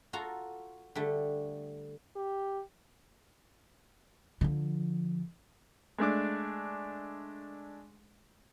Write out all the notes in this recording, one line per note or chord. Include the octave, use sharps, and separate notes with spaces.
F4 F#4 A4 A5 A#5
D3 G3 A3
G4
D3 F3
G#3 A3 D4 D6